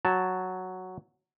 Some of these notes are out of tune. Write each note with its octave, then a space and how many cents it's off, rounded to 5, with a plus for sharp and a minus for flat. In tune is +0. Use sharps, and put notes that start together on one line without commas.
F#3 +0 A5 +0